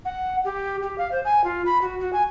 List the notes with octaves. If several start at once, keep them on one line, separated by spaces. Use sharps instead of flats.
F#5
G4
G4
F5
C5
G#5
F4
B5
F#4
F#4
G#5